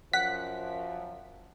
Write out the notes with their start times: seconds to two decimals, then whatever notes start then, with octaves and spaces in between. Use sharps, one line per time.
0.13 F#2 F3 F#5 B6